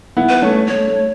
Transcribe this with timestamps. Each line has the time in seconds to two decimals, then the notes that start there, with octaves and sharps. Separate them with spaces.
0.17 B3 E4
0.29 B4
0.42 A3 C#4
0.68 A3 C#5
0.87 A3